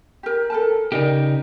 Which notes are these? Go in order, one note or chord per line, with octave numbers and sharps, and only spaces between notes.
G4 A#4
A4 A#4 A5
C#3 D#4 G4 A#4 D5 G5